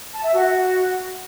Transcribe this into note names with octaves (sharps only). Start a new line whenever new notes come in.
A5
E5
F#4